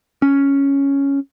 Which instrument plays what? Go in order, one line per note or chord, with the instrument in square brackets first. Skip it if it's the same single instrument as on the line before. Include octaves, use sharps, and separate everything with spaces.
[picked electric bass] C#4